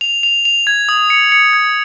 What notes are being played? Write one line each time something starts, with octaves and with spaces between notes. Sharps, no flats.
F7
F7
F7
G#6
D#6
C#7
C#7
G#6